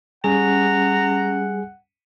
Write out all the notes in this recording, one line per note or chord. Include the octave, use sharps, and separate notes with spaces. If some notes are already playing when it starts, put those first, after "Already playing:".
G3 C#4 G#4 F#5 G#5 A#5